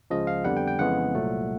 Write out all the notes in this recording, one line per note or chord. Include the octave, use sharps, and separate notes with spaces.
C#2 C#3 F3 D#5
F5
F2 D3 G3 B3 F#5
G5
G5
F2 C#3 E3 G#3 B3 F#5
C2 A#2 F#3 A3